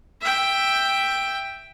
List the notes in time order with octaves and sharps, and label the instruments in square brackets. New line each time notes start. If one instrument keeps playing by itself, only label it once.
[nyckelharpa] E5 G5